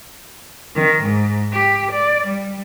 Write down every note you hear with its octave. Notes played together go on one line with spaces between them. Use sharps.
D#3
G#2
G4
D5
G3